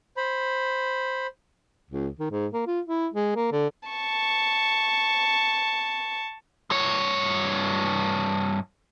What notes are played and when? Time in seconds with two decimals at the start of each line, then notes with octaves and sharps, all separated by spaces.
0.17 C5 B5
1.90 C#2
2.19 D#3
2.31 G#2
2.53 A#3
2.67 F4
2.87 E4
3.14 G#3
3.35 A#3
3.52 D3
3.89 A5 C#6
6.70 G2 C#5